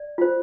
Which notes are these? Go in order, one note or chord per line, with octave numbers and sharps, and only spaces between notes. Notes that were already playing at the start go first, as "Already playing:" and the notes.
Already playing: D5
F4 C5